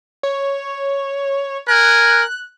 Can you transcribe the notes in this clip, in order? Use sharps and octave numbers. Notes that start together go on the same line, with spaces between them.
C#5
A#4 G#5 F#6